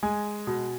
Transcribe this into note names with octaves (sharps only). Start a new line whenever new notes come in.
G#3 G#5
B2